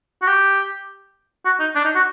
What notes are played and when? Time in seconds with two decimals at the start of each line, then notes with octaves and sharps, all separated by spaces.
0.22 F#4
0.27 G4
1.45 F#4
1.60 D#4
1.75 D4
1.85 D#4
1.95 F#4